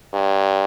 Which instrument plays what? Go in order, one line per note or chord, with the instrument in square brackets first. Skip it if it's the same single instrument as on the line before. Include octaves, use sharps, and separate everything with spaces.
[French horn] G2